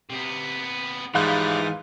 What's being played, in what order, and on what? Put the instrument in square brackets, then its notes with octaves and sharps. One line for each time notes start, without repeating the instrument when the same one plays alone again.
[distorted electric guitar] C3 B3
[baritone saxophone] G#2 [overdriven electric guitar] E3 E4 [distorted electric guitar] F3 G3 [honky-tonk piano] F5 F#6